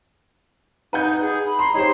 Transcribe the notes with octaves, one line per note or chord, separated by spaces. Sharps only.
D#4 B4 F#5 G6
G#4
B5
A#5 C6
D#4 G4 C5 C#5